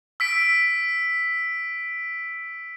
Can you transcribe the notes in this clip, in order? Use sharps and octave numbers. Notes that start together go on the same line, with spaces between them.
E6 B6 D7